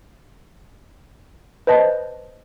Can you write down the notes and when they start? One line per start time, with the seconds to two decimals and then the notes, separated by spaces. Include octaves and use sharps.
1.67 B4 C5 D#5 A5